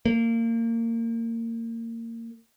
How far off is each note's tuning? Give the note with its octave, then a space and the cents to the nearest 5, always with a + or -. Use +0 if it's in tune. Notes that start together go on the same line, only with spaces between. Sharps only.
A#3 -25